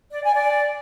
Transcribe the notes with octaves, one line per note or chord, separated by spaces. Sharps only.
D5
G#5
D5